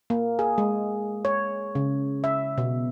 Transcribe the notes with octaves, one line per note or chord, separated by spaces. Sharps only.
A#3
G#4
G#3
C#5
C#3
E5
B2